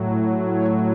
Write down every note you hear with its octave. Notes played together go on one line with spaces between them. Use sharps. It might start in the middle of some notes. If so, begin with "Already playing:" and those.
Already playing: A2 F#3
C#5